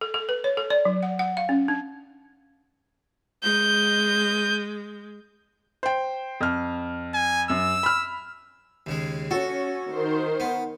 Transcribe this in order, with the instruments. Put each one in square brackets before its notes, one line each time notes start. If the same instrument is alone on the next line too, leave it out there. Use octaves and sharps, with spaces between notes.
[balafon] A4
A4
B4
C#5
A4
D5
F#3
F#5
F#5
F5
C#4
D4
[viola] G#3 [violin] G6
[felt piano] C5 G5
F2 F6
[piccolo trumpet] G#5
[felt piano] F#2 [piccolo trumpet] E6
[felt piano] B5 F6
[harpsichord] D#2 C#3 G#3
[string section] C#4 [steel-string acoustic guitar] F#4 [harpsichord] A4
[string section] D#3 C5
[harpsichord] B3